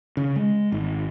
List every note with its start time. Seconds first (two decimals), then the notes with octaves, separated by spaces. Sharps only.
0.17 C#3
0.36 G#3
0.72 G#1